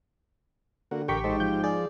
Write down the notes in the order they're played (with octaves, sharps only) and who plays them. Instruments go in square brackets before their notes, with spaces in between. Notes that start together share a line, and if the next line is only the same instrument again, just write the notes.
[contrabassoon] D3 [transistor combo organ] A#3 F#4
[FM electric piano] A1 C#6 B6 [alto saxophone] G4 [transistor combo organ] A#4 G5
[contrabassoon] G#2 [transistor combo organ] D#4 A4 C5
[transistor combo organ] F3 [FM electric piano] G6
[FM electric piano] G#4 [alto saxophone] D5